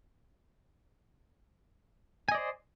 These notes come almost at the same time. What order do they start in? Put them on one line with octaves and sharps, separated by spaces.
G#5 D#5 D5 C5